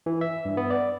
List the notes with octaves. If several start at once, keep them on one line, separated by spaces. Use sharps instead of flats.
E3
E5
G2
B3
D5